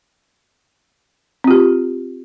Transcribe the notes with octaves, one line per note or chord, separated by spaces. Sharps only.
C4 F4 G4